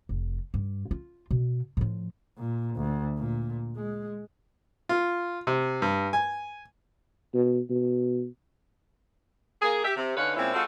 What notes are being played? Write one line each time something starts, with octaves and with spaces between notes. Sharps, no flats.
F1
G2
F4
B2
A2 F3
A#2
D2
A#2
G#3
F4
C3
G2
G#5
B2
B2
A#3 G#4
G4 E5
C3
D3 C#4 D#4 B4 C#5 F5
A#2 G#3 C4 C#4 E4
G#3 C4 F4 F#4 A4